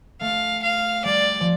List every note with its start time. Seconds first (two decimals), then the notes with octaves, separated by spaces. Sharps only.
0.20 A3 F5
0.62 F5
1.05 G3 D5
1.40 F3